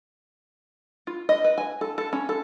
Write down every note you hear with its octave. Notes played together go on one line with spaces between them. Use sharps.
F4
D#5
B4
G#5
A4
A4
C#4
A4